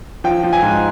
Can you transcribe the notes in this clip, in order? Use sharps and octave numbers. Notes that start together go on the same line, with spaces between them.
F3 G5
F3
G#5
G#2